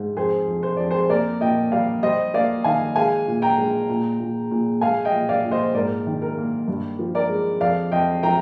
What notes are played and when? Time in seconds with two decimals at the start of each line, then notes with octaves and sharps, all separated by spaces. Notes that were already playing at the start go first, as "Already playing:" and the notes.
Already playing: G#2
0.17 F2 G#4 C5
0.47 F2
0.63 C5
0.77 F2 D5
0.91 G#4 C5
1.09 A#3 A#4 D5
1.41 A#2 D#5 G5
1.72 G3 D5 F5
2.03 G3 C5 D#5
2.34 A#3 D5 F5
2.64 D#3 F5 G#5
2.96 G#3 F5 G#5
3.28 A#2
3.42 G5 A#5
3.58 G#3
3.90 A#2
4.20 A#2
4.51 A#2
4.81 G#3 F5 G#5
5.05 D#5 G5
5.13 A#2
5.29 D5 F5
5.44 A#2
5.51 C5 D#5
5.74 G#2 A#4 D5
6.07 D#3
6.22 A#4
6.38 A#3
6.68 G2
6.99 F3
7.15 A#4 D5
7.30 G#3
7.61 F2 D5 F5
7.92 F2 D#5 G5
8.23 F3 G5 A#5